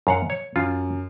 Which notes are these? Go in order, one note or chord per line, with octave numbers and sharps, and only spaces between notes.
F#2 F5 F#5
C#5
F#2 F4